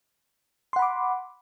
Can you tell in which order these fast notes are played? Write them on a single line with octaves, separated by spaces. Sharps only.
C6 F#5 B5 D6